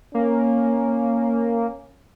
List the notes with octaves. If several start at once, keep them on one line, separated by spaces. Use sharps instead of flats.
A#3 C#4